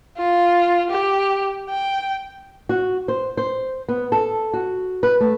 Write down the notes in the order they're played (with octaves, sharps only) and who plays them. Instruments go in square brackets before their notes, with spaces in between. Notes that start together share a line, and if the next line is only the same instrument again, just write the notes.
[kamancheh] F4
G4
G5
[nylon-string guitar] F#4
C5
C5
B3
A4
F#4
B4
A3